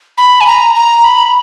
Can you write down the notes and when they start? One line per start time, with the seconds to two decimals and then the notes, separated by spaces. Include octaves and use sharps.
0.17 B5
0.40 G#5
0.46 A#5
0.75 A#5
1.04 B5